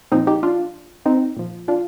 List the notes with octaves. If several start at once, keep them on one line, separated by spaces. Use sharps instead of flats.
A#2 F3 C4 D#4
D#4 G4
D4 F4
C4 D#4
A#2 F3
D4 F4